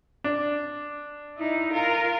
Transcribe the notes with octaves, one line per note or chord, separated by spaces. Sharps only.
D4
D#4 E4
F4 A#4